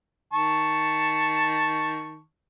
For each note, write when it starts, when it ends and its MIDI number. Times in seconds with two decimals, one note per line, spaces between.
0.33 2.20 51
0.33 2.20 81
0.33 2.20 85